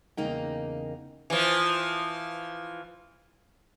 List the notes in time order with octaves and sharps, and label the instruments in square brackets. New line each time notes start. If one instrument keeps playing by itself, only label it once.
[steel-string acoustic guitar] E2 C#3 A#3 D#4 G5
[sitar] E3 F3